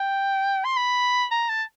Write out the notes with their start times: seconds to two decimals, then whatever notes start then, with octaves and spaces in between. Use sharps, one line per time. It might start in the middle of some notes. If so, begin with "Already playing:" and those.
Already playing: G5
0.65 C6
0.77 B5
1.31 A#5
1.49 A5